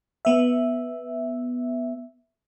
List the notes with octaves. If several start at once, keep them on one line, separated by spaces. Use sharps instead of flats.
B3 E5